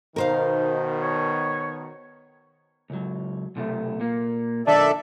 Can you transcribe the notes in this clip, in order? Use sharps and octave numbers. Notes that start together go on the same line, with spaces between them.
B2 D#3 D#4 A#4 C5 F5
C#5
C#2 F#3
B1 C3 A3
A#2 A#3
B1 D#3 D4 D#4 A4 D5 E5